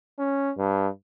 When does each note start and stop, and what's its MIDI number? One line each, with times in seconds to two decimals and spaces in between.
0.19 0.51 61
0.58 0.88 43